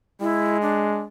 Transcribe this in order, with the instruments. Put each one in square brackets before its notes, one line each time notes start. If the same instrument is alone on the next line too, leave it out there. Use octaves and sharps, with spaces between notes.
[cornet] G#3 [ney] E4
[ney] D4